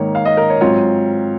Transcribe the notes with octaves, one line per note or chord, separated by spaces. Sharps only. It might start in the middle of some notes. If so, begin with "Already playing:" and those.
Already playing: G#2 D#3 A#3 D#4 C#5
F5
D#5
A#4
C#5
G#2 F#3 C4 F4 C#5